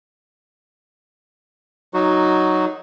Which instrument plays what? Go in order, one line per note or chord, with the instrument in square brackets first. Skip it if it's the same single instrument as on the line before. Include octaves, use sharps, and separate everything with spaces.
[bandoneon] F#3 D#4 F#4